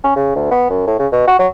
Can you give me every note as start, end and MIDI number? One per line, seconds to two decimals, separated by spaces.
0.04 0.14 61
0.16 0.32 49
0.36 0.48 38
0.51 0.68 59
0.70 0.86 42
0.87 0.96 45
0.99 1.07 49
1.12 1.26 47
1.28 1.35 66
1.39 1.48 54